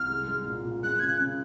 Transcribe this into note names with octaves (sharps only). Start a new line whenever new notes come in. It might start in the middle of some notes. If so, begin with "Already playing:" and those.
Already playing: C2 F6
G#3
G#3
A#2
A#2
G#3 F#6
C#3 G#6
F#6
C#3